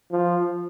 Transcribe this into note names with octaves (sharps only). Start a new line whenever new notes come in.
F3